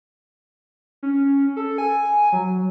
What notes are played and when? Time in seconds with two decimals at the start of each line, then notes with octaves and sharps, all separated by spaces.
1.03 C#4
1.56 A4
1.78 G#5
2.33 F#3